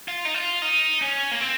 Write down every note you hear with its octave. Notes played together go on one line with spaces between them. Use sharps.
F4
D#4
F4
D#4
C#4
A#3
C4